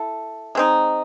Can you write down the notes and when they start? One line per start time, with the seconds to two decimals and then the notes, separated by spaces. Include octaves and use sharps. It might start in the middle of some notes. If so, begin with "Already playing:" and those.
Already playing: E4 A4
0.55 G#3 C4 D#4